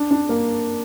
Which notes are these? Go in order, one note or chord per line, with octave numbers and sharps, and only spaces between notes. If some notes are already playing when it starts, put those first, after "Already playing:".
Already playing: D4
D4
A#3